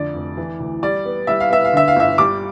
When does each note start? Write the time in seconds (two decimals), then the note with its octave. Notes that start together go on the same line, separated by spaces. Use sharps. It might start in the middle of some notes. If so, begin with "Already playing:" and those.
Already playing: F2 D3 A3 D5
0.15 F1
0.37 E3
0.60 D2
0.83 G3 D5
1.05 B3
1.27 G3 E5
1.40 F5
1.50 B3 E5
1.65 F5
1.73 D3 E5
1.88 F5
1.96 G1 E5
2.18 G3 D6